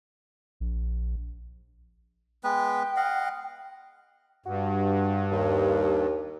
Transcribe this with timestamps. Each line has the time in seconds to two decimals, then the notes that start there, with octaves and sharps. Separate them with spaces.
0.60 A#1
2.44 G#3 B3 B4 G5
2.96 D#5 F5 F#5
4.46 G2 F#4
5.31 D#2